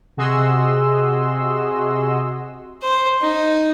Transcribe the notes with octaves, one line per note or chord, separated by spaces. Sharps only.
C3 F#4 G#4 D#5 C6 E6
C5
D#4